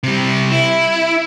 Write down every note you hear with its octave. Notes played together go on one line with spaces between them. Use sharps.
C3 G3
E4